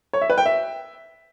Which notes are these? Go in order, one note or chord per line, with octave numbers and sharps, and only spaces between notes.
C#5
E5
B4
G5
E5